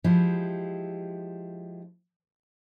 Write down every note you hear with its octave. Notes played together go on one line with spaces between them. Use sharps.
F3 G#3 E4 G4